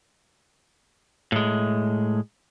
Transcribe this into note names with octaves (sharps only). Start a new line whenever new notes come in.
A2 G#3